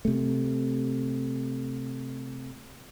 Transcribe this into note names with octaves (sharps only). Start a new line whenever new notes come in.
C3 A3